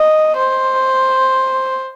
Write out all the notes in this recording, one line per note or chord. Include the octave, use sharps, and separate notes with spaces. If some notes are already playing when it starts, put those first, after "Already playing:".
Already playing: D#5
C5